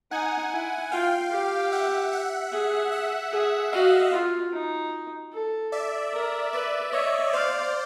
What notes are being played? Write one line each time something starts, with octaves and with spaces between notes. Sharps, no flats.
D#4 F#5 G#5
E4
F4 F5 G5
G4
E5 F#5
E5 F#5
G#4
E5 F#5
G#4
F#4 D#5 F5
F4
D#4
A4
D5 E5
A#4
B4 D5 E5
C#5 D#5 E5
C5 D5 F5